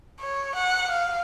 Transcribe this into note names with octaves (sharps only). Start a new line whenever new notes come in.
C#5
F#5
F5